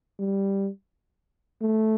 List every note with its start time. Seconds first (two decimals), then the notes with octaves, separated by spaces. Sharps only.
0.20 G3
1.62 A3